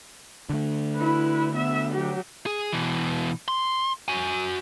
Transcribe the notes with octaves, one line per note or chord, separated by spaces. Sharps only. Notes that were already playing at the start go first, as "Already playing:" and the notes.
D3 A3
E4 B4
B3 E5
F#3 G4
G#4
B2 E3
C6
F#4 G#5